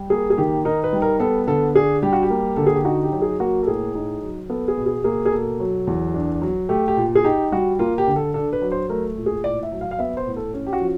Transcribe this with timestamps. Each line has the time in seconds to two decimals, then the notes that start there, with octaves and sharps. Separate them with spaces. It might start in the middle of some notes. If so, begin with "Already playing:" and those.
Already playing: G3
0.10 A#3 G#4
0.30 G#4
0.38 D#3 G4
0.65 D#4 A#4
0.84 B4
0.93 G3
1.02 A#4
1.20 B3 A4
1.47 D3 A4
1.75 D4 G#4
2.03 G3 G4
2.13 F#4
2.23 G4
2.30 A#3
2.56 D3 A4
2.67 G#4
2.76 G4
2.85 D#4 F#4
3.03 G4
3.12 F#3
3.22 G#4
3.40 A#3 F#4
3.63 A4
3.67 A2 G#4
3.95 D#4
4.22 F#3
4.50 B3 A4
4.68 G#4
4.77 B2
4.86 G#4
5.04 A#3 G#4
5.26 G#4
5.32 B2 A4
5.60 F#3
5.87 E2
6.14 D4
6.42 F#3
6.69 A3 G4
6.88 G4
6.97 A#2
7.15 G#4
7.24 D#4 G4
7.52 G3 F#4
7.79 A#3 F4
7.98 G4
8.07 D3
8.16 A4
8.34 D4 A4
8.53 B4
8.62 F#3
8.72 C5
8.89 A3 A#4
9.17 A#2
9.26 G#4
9.44 A2 D5
9.63 E5
9.72 F#3
9.81 F5
9.91 F5
9.99 B3 E5
10.17 C5
10.27 A2
10.36 A4
10.54 C#4
10.67 G4
10.73 F#4
10.81 F3